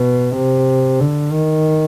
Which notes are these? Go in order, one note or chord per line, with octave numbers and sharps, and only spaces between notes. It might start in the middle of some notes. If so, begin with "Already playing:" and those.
Already playing: B2
C3
D3
D#3